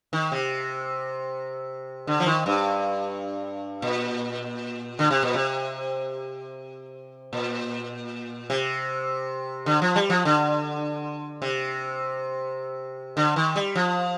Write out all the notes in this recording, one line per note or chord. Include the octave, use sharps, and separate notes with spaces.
D#3
C3
D3
F3
D#3
G2
A#2
D3
C3
A#2
C3
A#2
C3
D3
F3
G3
F3
D3
C3
D3
D#3
G3
F3